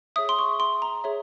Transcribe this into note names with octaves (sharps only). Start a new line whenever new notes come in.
G#4 C#5 E5 D#6
C6
C#6
C6
A#5
G#4 C#5 E5